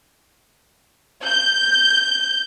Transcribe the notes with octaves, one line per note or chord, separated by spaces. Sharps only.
G6